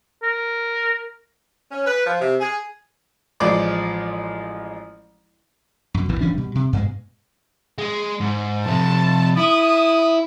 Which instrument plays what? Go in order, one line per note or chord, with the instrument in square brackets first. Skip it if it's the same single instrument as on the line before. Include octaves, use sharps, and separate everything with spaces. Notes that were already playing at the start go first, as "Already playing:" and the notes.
[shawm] A#4
[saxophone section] C#4
B4
F3
C3
G#4
[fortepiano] A1 F3 G#3 D5 D6
[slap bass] F#2 B2
A#1 E2 A2 E3
D1 E3 C#4 D4
B2 G3
C3
G2 B2 G#3
[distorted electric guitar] G#3
G#2
[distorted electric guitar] F2 C3 [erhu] A5
[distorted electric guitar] E4 [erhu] D#6